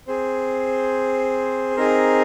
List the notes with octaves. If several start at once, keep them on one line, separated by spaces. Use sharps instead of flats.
C4 G#4 C5
C4 D#4 G#4 A#4